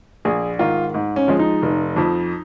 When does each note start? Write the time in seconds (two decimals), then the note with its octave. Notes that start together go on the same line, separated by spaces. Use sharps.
0.25 A#1 G#4
0.59 G#2 D#3 F4
0.94 G#2
1.16 C#4
1.28 F3 G#3
1.39 D#4
1.62 F1
1.96 F2 F3